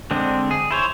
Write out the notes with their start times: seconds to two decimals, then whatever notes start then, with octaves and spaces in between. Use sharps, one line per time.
0.11 D3 G#3 C4 D4
0.51 G#4
0.71 E4 C5 C#5